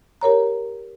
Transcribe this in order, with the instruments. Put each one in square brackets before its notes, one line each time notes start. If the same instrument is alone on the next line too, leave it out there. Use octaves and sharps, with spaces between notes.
[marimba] G4 A#4 C#5 A#5